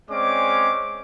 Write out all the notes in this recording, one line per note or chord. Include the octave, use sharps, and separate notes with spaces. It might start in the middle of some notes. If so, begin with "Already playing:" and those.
G#3 C4 C#4 D5 D6